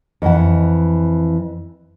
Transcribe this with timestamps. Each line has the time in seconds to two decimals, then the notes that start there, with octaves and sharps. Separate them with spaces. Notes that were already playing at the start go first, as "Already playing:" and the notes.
0.22 F2 E3 F#5